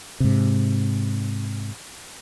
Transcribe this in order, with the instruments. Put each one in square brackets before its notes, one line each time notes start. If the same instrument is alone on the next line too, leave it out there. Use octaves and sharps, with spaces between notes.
[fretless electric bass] G#2 C3